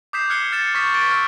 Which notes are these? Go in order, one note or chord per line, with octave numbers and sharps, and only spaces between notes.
D6 D#6 G6 B6 C7 E7
F6 F#6 G#6 C7 C#7 G7
F6 A6 C7 C#7 E7
C#6 D#6 F6 G6 A6 B6
C#6 A6 B6 D7 G7
E6 F6